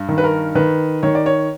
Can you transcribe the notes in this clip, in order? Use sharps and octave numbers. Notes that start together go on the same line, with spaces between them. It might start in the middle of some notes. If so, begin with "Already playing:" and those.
Already playing: G2
D#3
B4
A#4
D#3 B4
D#3 C#5
D5
C#5